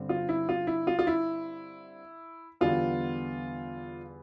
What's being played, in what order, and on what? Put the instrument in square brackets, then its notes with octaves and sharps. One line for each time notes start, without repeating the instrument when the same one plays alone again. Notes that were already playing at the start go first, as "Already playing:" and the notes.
Already playing: [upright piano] G2 D3 G3 C4
F4
E4
F4
E4
F4
F4
E4
E2 D3 G3 B3 F4